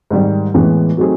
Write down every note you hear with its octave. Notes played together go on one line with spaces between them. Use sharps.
G#2 D#3 G3
A2 E3 G#3 B3
F#3 A3 C4 D#4 G#4